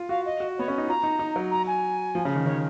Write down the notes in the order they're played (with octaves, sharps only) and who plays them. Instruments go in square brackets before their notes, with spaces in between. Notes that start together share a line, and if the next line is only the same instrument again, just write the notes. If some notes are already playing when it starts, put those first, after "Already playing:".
Already playing: [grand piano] F4
[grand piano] F#4 [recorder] F5
[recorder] D#5
[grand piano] F#4
[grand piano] B3 [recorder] C#5
[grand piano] C#4
D#4
[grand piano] F4 [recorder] A#5
[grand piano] D#4
D#4
F#3
[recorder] A#5
G#5
[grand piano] F3
C#3
D#3
[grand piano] D#3 [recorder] C#5